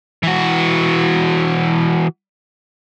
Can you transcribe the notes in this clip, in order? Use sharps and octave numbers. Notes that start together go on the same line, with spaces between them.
E3 F#4